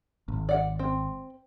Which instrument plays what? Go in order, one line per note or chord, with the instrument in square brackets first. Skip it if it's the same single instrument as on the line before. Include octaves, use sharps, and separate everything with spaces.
[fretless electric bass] G#1
[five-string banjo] D5 F#5
C4